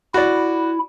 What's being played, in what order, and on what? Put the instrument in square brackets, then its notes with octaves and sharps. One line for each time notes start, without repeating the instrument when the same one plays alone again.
[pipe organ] E4 [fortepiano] F#4 D5